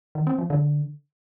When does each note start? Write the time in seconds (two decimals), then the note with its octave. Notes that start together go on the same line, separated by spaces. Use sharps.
0.15 D#3
0.27 C4
0.38 F3
0.50 D3